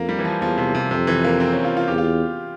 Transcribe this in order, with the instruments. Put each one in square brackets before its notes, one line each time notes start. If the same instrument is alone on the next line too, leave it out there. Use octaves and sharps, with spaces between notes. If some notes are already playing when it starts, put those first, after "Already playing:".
Already playing: [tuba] F2 [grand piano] A#3
[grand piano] G3
E3
F3
[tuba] E2 [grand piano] F3
[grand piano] C3
C3
[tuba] F2 [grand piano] C3
[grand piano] E3
A#3
C4
C#4
F4
F4
[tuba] E2 [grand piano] G4
[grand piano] F4